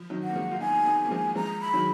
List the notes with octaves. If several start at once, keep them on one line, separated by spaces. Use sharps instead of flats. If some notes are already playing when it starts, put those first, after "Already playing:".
Already playing: F3
D#3 F#3
F#5
A#3
F3 G#3
F4
B3 D#4 G#5
B3 D#4
A#3
F3 G#3
F3 G#3 A#5
B5
D#3 F#3